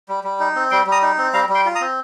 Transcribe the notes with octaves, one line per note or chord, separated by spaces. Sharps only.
G3
G3
D#4
C4
G3 G5 C6
G3 A#5 D#6
D#4
C4
G3 F5 A#5
G3
G5 C6
F4
A#5 D#6
C4